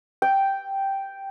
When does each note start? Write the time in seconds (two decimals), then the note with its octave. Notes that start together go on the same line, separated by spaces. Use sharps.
0.22 G5